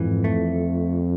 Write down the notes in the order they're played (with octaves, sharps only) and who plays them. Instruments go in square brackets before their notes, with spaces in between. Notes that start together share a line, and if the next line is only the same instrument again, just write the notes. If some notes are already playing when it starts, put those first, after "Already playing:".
Already playing: [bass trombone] F2 [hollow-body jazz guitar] G#2 E3
[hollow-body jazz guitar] A3